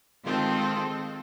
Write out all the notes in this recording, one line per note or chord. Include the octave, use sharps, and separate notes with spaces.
D#3 G#3 C4 F4 A4